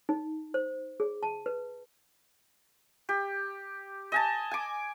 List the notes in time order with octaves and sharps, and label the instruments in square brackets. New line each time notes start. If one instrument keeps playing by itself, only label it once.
[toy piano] D#4
C5
G#4
A5
B4
[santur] G4
D#5 G#5 A5
G#5 D6